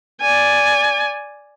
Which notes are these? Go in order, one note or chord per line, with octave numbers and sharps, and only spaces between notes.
D5 G#5